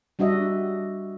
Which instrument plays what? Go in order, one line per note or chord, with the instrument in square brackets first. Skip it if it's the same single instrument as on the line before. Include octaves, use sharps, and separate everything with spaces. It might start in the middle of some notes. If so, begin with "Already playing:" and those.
[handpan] G3 D4 F#4 D#5 E5